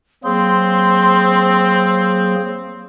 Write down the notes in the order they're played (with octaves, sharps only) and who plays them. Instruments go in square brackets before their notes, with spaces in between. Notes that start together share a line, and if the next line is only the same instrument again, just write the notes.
[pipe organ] F#3 A#3 G#4 [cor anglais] C4 [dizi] C6